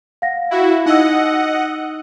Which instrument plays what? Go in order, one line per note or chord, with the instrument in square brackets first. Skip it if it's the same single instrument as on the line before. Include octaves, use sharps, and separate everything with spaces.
[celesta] F5 F#5 A#6
[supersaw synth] E4 F#4
[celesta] D#4 E6 [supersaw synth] D#5 F#5